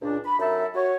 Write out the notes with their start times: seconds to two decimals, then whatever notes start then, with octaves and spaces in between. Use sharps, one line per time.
0.02 C#2 A#2 D4
0.24 B5
0.39 F#2 D#4 A4 E5
0.74 F#4 C#5